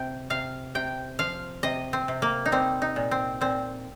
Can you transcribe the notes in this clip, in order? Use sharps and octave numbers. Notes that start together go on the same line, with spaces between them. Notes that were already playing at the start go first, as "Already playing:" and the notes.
Already playing: C3 G5
C3 F5
C3 G5
F3 F5
C3 D#5
C4
C3
A#3
D#4
G3 C4
D#4
A#2
C4
A#2 C4